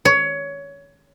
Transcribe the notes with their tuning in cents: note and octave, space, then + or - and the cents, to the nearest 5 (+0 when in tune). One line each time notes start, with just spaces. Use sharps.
C#5 +20